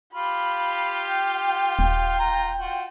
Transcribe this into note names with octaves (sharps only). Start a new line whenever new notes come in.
F4 G4 F5 B5
G5
D#1
F4 A#5
F4 F#4